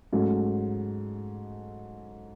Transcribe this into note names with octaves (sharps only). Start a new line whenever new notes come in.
G#2 F#3 A3 C#4